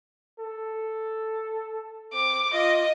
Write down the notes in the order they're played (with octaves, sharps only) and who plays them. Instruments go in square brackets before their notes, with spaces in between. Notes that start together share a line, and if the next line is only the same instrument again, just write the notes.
[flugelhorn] A4
[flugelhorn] C4 [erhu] D6
[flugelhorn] F4 [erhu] D#5